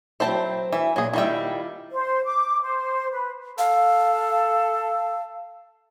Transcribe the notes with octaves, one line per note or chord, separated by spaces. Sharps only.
F#3 C4 E4 C5 G5 A5
E3 E5
A#2 F#3 G#4
D#3 G3 E4 F4 E5 G5
C5
D6
C5
B4
A4 F5